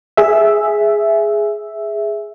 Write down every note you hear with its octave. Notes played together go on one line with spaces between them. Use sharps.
G#4 E5